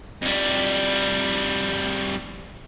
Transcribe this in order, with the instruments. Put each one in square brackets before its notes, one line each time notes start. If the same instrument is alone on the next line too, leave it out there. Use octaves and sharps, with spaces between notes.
[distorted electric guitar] F2 G3